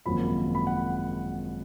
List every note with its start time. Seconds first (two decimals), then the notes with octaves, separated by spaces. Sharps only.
0.06 G#1 F#2 F3 A#3 B5
0.55 B5
0.67 F#5